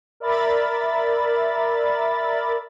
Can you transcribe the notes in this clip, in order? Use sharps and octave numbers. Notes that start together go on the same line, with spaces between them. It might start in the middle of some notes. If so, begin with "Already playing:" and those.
A#4 D5 E5 B5 A6